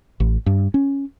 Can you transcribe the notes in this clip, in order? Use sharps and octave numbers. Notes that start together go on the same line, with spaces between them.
A1
G2
C#4